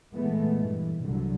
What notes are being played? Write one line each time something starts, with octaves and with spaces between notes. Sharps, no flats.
A#2 E3 G#3 A3 B3
G2 E3
C2 D3 F#3